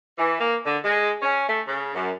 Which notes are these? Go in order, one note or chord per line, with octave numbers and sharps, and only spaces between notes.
E3
A#3
D3
G#3
C#4
A3
C#3
F#2